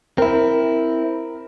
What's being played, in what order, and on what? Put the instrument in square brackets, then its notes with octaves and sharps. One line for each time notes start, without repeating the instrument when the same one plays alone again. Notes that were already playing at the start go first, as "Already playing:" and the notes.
[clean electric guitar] C4 E4 [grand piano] A#4